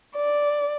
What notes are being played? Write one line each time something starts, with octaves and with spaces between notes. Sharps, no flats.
D5